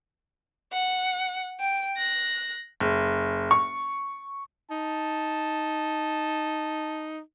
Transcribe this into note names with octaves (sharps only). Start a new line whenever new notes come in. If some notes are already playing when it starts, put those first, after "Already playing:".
F#5
G5
F#6 A#6
F#1
C#6
D#4 A5